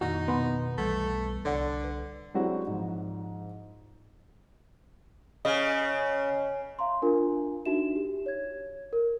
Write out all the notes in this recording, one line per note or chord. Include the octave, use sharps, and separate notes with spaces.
F2 A#2 D#3 D#4 F#4
B2 B3 G#5 B5 C6
B1 E3 G3 A3
C2 D3 C#5 D5 F#5
B4
F#3 G#3 C4 D4 E4 F#4
G#2 F3
C#3 D#5
E5 F5 A#5 C6
D4 F4 A#4 G#5
D4 D#4 F#4 E5 E7
G4
C#5 G#6
A#4